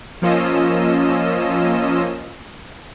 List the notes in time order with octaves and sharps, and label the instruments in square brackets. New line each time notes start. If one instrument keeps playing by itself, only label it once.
[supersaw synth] F3 A#3 C#4 F4 D#5 E6